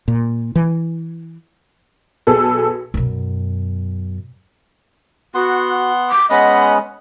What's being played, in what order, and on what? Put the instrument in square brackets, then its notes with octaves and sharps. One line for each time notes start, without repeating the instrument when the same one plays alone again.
[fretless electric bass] A#2
E3
[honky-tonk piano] B1 G#4 A4 B4
[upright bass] F#2 B2
[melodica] B3 F#5 C6 [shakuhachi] F#4
[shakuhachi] D6
[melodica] G#3 B3 C#4 [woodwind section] D#5 F#5 [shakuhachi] B5